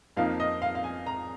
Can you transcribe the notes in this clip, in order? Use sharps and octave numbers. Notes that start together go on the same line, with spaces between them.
F2 F3 A#3 D#4 F5
D#5
F5
F5
G#5
A#5